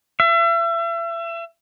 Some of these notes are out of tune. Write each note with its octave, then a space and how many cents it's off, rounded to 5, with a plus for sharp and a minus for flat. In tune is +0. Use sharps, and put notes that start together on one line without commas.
E5 +35